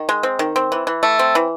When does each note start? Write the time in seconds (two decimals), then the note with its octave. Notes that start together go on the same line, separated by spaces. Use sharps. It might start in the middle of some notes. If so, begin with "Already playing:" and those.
Already playing: D#3
0.09 G#3
0.23 C4
0.39 D#3
0.56 C4
0.72 E3
0.87 E3
1.03 A3
1.19 C4
1.35 E3